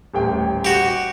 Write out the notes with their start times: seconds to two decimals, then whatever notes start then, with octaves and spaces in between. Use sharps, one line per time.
0.13 D#1 A1 G5
0.65 F#4 G4